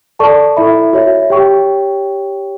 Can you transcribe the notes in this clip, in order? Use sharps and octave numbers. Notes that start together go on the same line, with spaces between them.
A4 D5 A5 C#6
E4 A4 E5 B5
F#4 C#5 E5
G4 C#5 G5 C#6